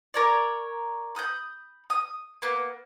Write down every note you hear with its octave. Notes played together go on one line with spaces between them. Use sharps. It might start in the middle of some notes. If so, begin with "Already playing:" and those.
A#4 C#5 D5
B5 D#6 F#6 G6
D#6
A#3 B3